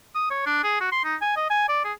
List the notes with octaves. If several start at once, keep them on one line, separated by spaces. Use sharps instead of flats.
D#6
C#5
D4
G#4
F#4
C6
D#4
G#5
D#5
G#5
D5
G#4